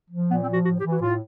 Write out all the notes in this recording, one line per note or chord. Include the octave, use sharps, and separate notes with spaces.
F3
A#2 B3
C4
F3
F#4
A2 F#4
G4
E3
F#4
A2 F4